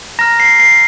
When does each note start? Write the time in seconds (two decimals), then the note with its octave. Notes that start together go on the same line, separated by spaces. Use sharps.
0.19 A#5 F6 A#6
0.40 C7
0.60 C7